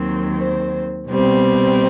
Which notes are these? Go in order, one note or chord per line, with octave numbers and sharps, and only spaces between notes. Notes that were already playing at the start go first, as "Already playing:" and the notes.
Already playing: D#2 D#3 F#3 C4
C5
B2 G3 C4